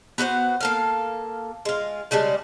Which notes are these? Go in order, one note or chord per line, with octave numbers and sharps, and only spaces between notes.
B3 F#4 B4 C5
A#3 A4 F5
G#3 F4
C#3 G3 G#3 D4